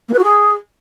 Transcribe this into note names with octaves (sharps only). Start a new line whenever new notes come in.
A#3
B4
F#4
G#4